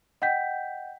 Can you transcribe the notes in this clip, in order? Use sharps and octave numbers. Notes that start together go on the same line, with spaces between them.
D#5 F#5 G5 G6 B6